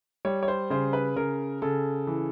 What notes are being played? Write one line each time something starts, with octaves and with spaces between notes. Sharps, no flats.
G3 C#5
C#5
C5
C#3 C5
B4
C#3 A#4
C#3 A4
E3